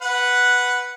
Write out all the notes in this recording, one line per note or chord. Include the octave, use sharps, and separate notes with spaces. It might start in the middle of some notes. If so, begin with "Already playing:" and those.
B4 F#5